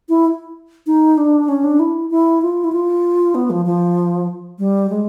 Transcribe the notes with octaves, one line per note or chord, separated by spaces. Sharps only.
E4
D#4
D4
C#4
D4
E4
E4
F4
E4
F4
B3
F3
F3
G3
G#3